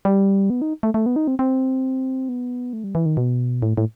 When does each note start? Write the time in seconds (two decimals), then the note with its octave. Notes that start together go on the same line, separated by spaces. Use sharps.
0.05 G3
0.50 B3
0.62 D#4
0.83 A3
0.94 A3
1.06 B3
1.16 D#4
1.28 C4
1.39 C4
2.29 B3
2.73 A3
2.84 G3
2.95 E3
3.06 D#3
3.17 B2
3.62 A2
3.77 A2